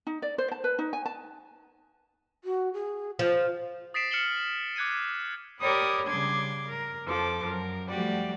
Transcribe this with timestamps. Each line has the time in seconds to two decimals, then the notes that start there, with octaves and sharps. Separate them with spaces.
0.07 D#4
0.22 D5
0.38 C5
0.52 A5
0.64 B4
0.79 D#4
0.93 G#5
1.06 A5
2.44 F#4
2.74 G#4
3.19 F3 C5
3.94 D#6 A6 B6 C7 D7 E7
4.11 F6 C#7 D7 E7 F#7 G7
4.76 D6 F#6 G#6 C#7 D#7
5.61 G4 A#4 C#5 D5 B5 D#6
6.06 C#3 G3 D4 C6 D6 G#6
6.67 A#4
7.05 F2 F3 A4 D6
7.44 F#2 A#4
7.89 F3 G3 A3 F#4 G4 D5